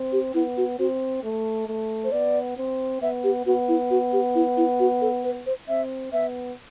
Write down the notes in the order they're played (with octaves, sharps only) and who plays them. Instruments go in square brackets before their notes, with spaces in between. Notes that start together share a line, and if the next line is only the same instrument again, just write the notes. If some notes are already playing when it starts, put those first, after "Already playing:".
Already playing: [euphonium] C4
[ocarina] G4
[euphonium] B3 [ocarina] E4
[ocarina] F#4
[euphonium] C4 [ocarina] F#4
[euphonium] A3
A3
[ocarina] C5
[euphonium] B3 [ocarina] D5
[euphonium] C4
[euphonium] B3 [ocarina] E5
[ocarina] G4
[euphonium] B3 [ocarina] F#4
[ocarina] E4
F#4
G4
E4
E4
F#4
A4
B4
C5
[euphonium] C4 [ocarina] E5
[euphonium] B3 [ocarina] E5